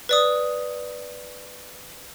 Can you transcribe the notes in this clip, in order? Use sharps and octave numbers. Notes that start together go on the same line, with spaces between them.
B4 D5 D#6